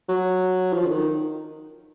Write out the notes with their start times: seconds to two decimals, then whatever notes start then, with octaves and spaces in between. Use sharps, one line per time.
0.09 F#3
0.73 F3
0.85 D3
0.89 D#3